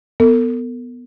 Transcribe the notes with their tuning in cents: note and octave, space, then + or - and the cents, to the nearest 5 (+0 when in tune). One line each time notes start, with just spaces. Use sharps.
B3 +0 A4 +45